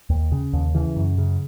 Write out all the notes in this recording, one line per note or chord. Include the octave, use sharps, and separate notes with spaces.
D#2
C#3
D#2
C#3 E3
F#2
C#3